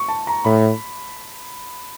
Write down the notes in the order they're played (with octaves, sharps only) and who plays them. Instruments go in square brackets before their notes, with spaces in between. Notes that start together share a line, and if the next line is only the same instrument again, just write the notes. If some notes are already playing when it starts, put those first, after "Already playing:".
Already playing: [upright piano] C#6
A5
A#5
[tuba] A2 [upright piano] B5